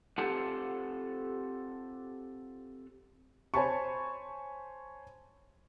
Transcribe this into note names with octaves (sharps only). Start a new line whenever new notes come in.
C4 F4 G4 A4 F#5 A5
C5 C#5 G#5 A5 B5 C#6